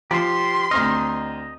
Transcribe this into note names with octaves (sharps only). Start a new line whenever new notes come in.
F3 G4 C5 C6
D2 C4 D#5 A#5 F6